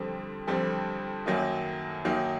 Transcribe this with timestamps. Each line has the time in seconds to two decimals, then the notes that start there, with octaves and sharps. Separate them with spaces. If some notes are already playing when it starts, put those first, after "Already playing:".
Already playing: F2 D3 G3 C4
0.47 F2 D3 G3 C4
1.26 F#2 D#3 F#3 A#3 D#4
2.05 F#2 D#3 F#3 A#3 D#4